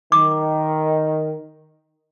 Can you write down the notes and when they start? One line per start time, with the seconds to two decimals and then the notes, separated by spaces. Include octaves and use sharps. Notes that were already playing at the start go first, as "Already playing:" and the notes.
0.12 D#3 D6